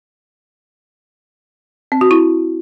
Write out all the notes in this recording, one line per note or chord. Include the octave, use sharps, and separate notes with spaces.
C4
F#4
E4